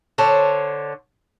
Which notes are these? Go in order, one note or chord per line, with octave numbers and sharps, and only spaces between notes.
D3 C5 C#5 A5